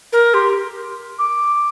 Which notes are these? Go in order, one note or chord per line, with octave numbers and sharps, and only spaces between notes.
A#4
G4 C6
D6